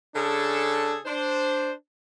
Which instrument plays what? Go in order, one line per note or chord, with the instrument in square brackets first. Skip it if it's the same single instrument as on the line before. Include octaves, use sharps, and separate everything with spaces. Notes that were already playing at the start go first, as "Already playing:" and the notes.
[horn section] C#3 D4 G#4 A4
D4 C5